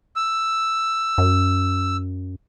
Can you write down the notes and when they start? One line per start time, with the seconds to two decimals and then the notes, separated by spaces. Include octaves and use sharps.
0.16 E6
1.18 F#2